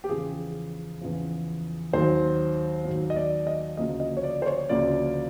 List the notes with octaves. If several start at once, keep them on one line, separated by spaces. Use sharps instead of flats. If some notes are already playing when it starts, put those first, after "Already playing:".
G4
E2 C#3 F3 G#4
E2 C#3 F3
D#2 D#3 F#3 C5
D#2 D#3 F#3
D#5
D5
D#5
D2 C#3 F3 A#3 D#5
D#5
C#5
D5
C5
C#5
D2 C#3 F3 A#3 D5